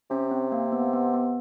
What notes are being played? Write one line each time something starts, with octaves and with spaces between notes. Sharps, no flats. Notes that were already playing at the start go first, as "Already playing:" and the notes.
C3 C#4
C4
A#3
B3
B3
B3